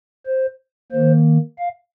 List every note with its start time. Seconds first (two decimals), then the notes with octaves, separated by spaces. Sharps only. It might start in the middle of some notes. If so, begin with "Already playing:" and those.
0.27 C5
0.92 D#3 A#3 C5
1.59 F5